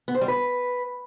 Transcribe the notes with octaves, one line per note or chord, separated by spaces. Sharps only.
B3
C5
G3
B4